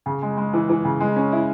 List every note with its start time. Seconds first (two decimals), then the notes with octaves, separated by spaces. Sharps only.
0.06 C#3
0.22 G#3
0.37 G#3
0.53 E3
0.69 E3
0.85 C#3
1.00 G#3
1.16 C#4
1.32 E4